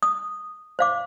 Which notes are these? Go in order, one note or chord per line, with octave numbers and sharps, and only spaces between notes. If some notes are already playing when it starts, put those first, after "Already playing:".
D#6
C5 F5 D6